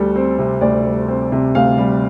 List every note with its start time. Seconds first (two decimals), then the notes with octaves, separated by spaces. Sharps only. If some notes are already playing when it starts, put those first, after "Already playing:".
Already playing: D2 G3 A4
0.15 C4
0.39 C3
0.61 D2 D5
0.85 G3
1.08 C4
1.32 C3
1.55 D2 F5
1.78 G3